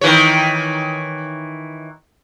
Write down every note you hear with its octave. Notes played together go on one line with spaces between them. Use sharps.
D#3 E3 C#5